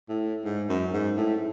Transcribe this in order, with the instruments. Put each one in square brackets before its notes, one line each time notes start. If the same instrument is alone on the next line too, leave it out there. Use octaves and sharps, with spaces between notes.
[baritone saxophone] A2
G#2
F#2
G#2
A2